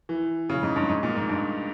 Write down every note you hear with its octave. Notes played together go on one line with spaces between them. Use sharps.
E3
C#3
G#2
G2
G#2
A#2
G#2
G2